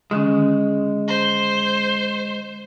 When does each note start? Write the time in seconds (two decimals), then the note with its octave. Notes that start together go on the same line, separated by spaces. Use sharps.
0.11 D3 D#3 G#3 C#4
1.08 C5